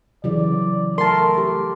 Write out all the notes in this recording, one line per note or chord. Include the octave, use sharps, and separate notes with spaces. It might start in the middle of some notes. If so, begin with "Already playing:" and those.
C#3 E3 F#3 D5
A3 A#4 A5 C6
G4